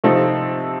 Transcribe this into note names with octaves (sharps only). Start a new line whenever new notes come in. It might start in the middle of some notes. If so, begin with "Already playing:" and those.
C3 F3 A3 C4 D#4